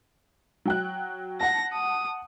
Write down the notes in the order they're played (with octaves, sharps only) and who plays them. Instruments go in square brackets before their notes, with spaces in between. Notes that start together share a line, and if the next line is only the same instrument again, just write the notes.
[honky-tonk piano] F#3 G5 F#6
[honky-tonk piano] F#5 A5 [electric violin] A#6
[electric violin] D#6